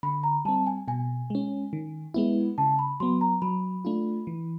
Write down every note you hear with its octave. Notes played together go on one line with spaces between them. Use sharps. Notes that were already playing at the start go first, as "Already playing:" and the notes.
D3 B5
A#5
G3 C4 A5
G#5
B2 G#5
G#3 C#4
D#3
G#3 B3 E4
C#3 A5
B5
F#3 B3 C6
A#5
F#3 B5
A3 D4 F4
E3